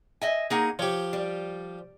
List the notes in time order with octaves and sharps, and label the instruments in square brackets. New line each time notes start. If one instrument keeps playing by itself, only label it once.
[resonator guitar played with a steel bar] D#5 E5 G#5
[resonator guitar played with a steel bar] A#3 D#4 F#5 [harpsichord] G#4
[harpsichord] F3 G4 [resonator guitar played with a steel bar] C#5
[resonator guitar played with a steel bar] G3